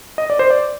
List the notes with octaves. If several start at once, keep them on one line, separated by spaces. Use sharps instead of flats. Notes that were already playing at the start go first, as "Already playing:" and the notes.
D#5
D5
C5
D5